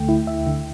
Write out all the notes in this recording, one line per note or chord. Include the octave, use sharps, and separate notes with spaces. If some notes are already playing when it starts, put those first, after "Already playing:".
Already playing: D2 D3 A3 G5
E4
D2 E5
D3